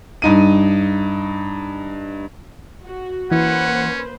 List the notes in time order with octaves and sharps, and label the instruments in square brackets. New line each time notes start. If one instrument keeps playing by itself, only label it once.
[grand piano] G2 D#4 D#7
[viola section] F#4
[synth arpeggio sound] E3 [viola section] A#3 B4 C5 [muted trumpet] C#4 [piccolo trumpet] F#5